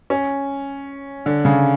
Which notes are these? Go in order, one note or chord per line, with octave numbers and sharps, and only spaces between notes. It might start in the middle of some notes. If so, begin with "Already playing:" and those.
C#4
D3
C#3